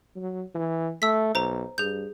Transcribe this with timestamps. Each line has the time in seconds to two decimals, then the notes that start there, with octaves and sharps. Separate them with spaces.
0.16 F#3
0.55 E3
1.02 A3 E6 B6
1.35 B1 C5 A#5
1.78 G2 G#4 G6